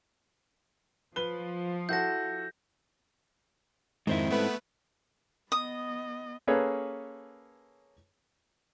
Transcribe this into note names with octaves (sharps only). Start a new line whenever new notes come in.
F3 B4 G7
E4 F#4 A4 G6 A#6
F2 G#2 D#3 C4 E4
A3 B3 B4
B3 D#5 D#6
A#3 C#4 G#4 A4 B4 C#5